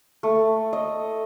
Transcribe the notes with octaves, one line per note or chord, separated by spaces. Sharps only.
A3
D#5